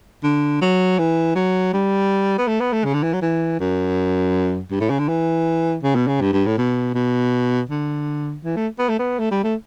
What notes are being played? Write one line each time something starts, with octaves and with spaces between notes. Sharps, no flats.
D3
F#3
E3
F#3
G3
B3
A3
B3
A3
C#3
D3
E3
F#3
E3
F#2
G2
A2
C#3
D3
E3
C#3
B2
C#3
G2
G2
A2
B2
B2
D3
E3
A3
B3
A3
B3
A3
G3
A3